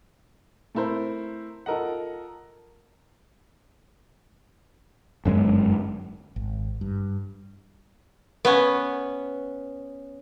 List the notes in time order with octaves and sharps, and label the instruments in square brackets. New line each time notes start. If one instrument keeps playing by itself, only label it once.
[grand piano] A3 C4 E4 A#4 C5
F4 A4 A#4 D#5 F#5
[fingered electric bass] G1 F#2 C#3 G#3
[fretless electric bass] G#1
G2
[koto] B3 C#4